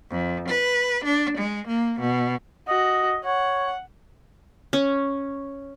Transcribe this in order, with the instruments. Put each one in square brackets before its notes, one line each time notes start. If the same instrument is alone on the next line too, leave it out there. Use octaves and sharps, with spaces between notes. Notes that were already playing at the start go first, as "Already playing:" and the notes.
[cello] F2
B4
D4
G#3
A#3
B2
[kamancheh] F#4 [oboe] D#5
[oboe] C#5 [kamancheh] F#5
[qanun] C#4